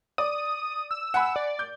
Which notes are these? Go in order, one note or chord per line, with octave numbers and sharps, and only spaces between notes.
D5 D#6
E6
F#5 G#5 B5
D5
G6